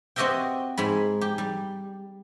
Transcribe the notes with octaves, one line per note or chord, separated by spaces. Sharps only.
C4 F#4 G4 D#5 E5 G5
G#2 G#3 B5
G4
G3